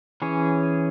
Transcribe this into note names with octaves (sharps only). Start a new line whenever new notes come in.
E3 C#4 G#4 C#5